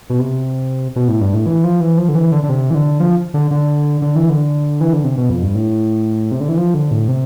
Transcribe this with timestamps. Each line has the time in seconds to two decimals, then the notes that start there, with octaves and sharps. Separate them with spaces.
0.10 B2
0.19 C3
0.96 B2
1.08 A2
1.21 G2
1.34 A2
1.46 E3
1.64 F3
1.80 E3
1.98 F3
2.09 D3
2.15 E3
2.32 D3
2.43 D3
2.49 C3
2.70 E3
2.75 D3
3.00 F3
3.34 D3
3.51 D3
4.02 D3
4.16 E3
4.29 D3
4.81 E3
4.93 D3
5.04 C3
5.17 B2
5.30 F2
5.43 G2
5.55 A2
6.31 C3
6.40 D3
6.49 E3
6.57 F3
6.74 D3
6.91 A2
7.08 C3